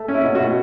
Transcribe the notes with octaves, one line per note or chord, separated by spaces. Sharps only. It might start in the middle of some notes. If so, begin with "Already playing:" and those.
Already playing: A3
C#4
E4
B2
F#4
B2